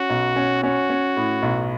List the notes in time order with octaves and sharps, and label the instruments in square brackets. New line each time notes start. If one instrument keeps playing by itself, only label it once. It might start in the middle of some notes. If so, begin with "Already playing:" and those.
Already playing: [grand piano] C#4 [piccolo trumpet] F#4
[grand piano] B1
C#4
[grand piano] C#4 [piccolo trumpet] F#4
[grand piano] C#4
A2
B1